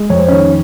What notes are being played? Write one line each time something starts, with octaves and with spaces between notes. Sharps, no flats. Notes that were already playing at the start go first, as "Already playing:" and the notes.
Already playing: G#3
F2 C#5
C5
D#3 C#4 C#5